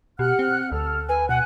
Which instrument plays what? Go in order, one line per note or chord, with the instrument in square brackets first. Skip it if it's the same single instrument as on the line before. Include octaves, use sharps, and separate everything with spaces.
[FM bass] B2 [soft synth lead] G4 [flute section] F#5 F6 F#6
[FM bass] C4
[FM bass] D2 [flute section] A4 [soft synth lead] F6
[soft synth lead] B4 [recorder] G#5
[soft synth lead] B2 [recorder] F#5 [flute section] G#5 F#6